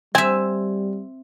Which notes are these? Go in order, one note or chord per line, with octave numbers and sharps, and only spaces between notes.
G3 C4 E5 G#5